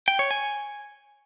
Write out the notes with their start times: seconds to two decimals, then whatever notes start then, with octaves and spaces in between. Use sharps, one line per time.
0.08 G5
0.19 C#5
0.31 G#5